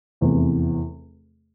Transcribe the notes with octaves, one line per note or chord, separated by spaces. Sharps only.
F1 E2 C3 E3